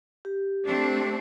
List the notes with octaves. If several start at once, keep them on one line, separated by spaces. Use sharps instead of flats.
G4
A3 C4 D4